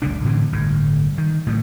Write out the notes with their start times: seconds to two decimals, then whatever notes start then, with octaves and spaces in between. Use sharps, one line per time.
0.02 F#1 C#2 A#2 D4
0.25 A2 D3 E3 C4
0.52 G1 A2
1.18 D#3
1.47 A2 D#3 F#3